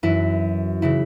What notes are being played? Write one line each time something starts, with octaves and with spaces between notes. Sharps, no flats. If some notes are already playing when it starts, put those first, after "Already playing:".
F#2 E3 E4
C#3 E3 E4